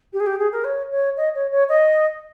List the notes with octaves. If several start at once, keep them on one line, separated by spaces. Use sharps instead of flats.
G4
G#4
G4
G#4
A#4
C#5
C#5
D#5
C#5
C#5
D#5